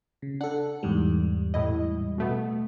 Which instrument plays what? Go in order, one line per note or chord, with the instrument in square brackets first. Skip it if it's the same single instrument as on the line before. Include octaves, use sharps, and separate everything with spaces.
[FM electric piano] C#3
[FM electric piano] D4 A4 [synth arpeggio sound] F#5
[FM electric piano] E2 G#2 G3
[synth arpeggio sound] A2 E4 D#5
B2 A3 B3